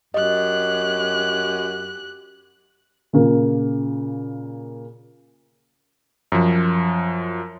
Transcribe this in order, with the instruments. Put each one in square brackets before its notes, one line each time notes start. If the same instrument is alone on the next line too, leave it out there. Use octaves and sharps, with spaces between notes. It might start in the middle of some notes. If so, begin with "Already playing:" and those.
[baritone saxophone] F#2 [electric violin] G4 F#6 [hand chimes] D#5
[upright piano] A#2 C#3 A#3
[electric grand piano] F#2 F3